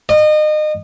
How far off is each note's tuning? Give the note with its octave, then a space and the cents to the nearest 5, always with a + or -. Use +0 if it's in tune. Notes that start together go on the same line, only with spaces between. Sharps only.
D#5 -30